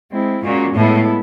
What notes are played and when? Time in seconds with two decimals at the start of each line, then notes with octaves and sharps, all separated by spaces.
0.11 G#3 C4 E4
0.43 A#2 G#3 C#4 F#4
0.75 A2 G#3 B3 E4 A4